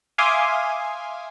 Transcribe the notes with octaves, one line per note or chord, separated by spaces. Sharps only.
E5 F5 G#5 C6 D6 D#6